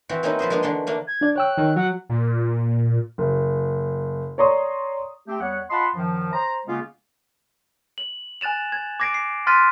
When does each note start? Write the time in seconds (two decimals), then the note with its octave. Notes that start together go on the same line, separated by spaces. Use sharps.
0.09 E3 C4 F#4
0.23 A#3 C4 C#4 D#4 F#4 B4
0.39 F3 B4 C5 D#5
0.50 G#3 A#3 B3 D4 G#4
0.63 D3 E3 A3 C6
0.87 A3 A#3 D4
1.07 G#6
1.21 D4 D5
1.36 C#5 G5 E6 F#6
1.57 D#3
1.76 F#3 F#5
2.09 A#2
3.18 F#1
4.38 C#5 D5 A#5 C6 C#6 D#6
5.27 A3 C4 G4
5.40 E2 G3 B3 C#5 F#5
5.70 F4 D#5 F#5 A5 B5 C6
5.94 F#2 D#3 F3
6.32 C5 A#5
6.66 C#3 G#3 A#3 B3 C#4 F4
7.98 F#7
8.41 G#5 F#6 A6 E7 F7
8.72 G#6
9.00 D6 G#6 A#6 C7 D7
9.14 C7
9.47 C6 F6 F#6 A6 B6 D#7